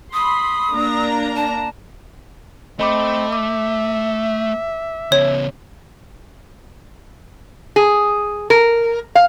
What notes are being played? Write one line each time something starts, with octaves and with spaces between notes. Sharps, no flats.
B5 C6 D#6
A#3 D4 A#5
A5
A3 C4 D#5 B5 D6
E5 D6
C#3 B3 C#5
G#4
A#4
F5